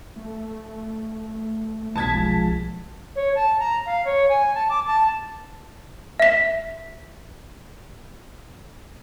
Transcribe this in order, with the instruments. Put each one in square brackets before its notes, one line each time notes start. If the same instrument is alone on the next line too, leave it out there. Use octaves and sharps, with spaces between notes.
[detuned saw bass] A3
[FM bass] B1 [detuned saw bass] E2 [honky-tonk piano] A5 G#6 B6
[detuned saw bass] D#1 [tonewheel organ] F3 G#3
[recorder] C#5
A5
A#5
F5
C#5
G#5
A5
D6
A5
[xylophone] E5 B6